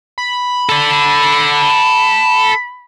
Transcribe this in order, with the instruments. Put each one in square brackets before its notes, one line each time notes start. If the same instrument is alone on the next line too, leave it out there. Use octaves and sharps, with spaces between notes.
[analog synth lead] B5
[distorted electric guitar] A4 D5